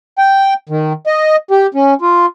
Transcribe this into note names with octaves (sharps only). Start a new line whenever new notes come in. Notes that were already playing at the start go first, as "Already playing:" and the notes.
G5
D#3
D#5
G4
C#4
F4